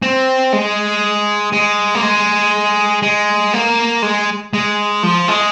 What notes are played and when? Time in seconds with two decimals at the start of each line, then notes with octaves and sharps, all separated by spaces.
0.02 C4
0.53 G#3
1.52 G#3
1.95 A#3
2.03 G#3
3.02 G#3
3.53 A#3
4.02 G#3
4.53 G#3
5.03 F3
5.28 G#3